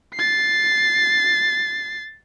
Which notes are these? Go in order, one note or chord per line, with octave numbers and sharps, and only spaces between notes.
A6 C7